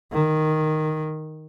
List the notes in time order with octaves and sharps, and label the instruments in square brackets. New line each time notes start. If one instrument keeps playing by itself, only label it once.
[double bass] D#3